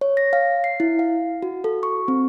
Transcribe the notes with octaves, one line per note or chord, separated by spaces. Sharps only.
C#5
A#6
F5
C7
E4
F5
F#4
A4
C#6
C4